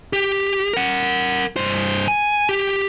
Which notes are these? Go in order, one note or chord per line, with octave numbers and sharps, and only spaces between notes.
G4
A#4 F#5
G2 C5
G#5
G4